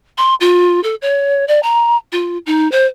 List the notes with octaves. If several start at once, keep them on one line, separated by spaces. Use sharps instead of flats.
C6
F4
A4
C#5
D5
A#5
F4
D#4
C5